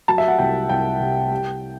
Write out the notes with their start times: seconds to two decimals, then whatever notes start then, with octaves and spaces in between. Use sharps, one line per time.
0.08 F#3 A5
0.18 E5
0.28 F#5
0.39 C2 G5
0.69 C2 G5
1.00 C3
1.31 G3